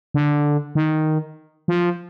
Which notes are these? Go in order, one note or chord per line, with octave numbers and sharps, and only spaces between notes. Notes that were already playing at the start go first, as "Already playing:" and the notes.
D3
D#3
F3